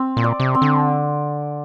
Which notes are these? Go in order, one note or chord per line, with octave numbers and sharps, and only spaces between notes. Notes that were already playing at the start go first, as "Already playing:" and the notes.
Already playing: C4
A#2
D5
C3
C4
D3